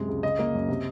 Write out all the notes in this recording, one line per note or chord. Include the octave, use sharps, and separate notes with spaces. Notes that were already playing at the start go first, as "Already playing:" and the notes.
Already playing: F#2 C3 G#3
C#2
C#3 D#5
A#3
F#2
C3